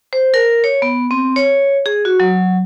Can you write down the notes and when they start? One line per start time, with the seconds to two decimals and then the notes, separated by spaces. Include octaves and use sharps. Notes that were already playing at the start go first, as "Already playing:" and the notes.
0.13 C5
0.34 A#4
0.64 C#5
0.82 B3
1.11 C4
1.36 C#5
1.86 G#4
2.05 F#4
2.20 F#3